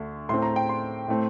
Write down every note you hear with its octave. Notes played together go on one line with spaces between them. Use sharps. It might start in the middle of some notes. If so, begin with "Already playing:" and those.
Already playing: D2 D3 A3
A2 A3 C4 C6
A#5
G5
C6
A2 A3 C4